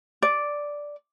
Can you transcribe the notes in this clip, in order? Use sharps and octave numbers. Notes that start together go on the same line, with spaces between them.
D5